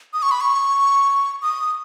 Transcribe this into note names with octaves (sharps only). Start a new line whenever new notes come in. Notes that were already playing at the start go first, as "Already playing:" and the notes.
D#6
C#6
B5
C#6
D#6